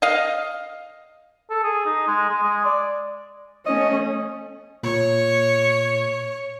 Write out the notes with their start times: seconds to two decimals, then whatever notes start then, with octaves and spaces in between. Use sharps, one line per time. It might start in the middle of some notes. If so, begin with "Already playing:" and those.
0.02 D#5 F5
1.50 A4
1.63 G#4
1.86 D#4
2.07 G#3
2.30 G#3
2.43 G#3
2.65 D5
3.66 A3 C#4 D#5
4.83 A#2 C#5